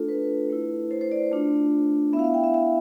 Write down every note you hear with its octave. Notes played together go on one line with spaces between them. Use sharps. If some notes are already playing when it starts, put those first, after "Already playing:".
Already playing: A3 D4 F4 A4
B4
A3 E4
C5
C5
D5
A3 D4 F4
B3 E4 E5 F5
E5
G5
E5
E5